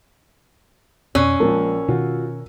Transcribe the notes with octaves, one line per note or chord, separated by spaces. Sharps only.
F2 B2 C#4 E6 F#6 C7
A#1 F3 G#3 A#4 A5
B2 D#3 F4 F#4